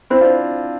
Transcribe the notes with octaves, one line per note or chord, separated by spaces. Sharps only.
C4 E4 C5
D4 F4